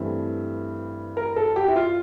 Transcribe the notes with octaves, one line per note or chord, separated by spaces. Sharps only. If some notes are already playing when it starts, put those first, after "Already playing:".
Already playing: G2 E3 A3 C4 E5
A#4
A4
G4
E4
F4